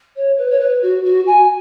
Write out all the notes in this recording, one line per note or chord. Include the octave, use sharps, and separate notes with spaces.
C#5
B4
C#5
B4
F#4
F#4
G#5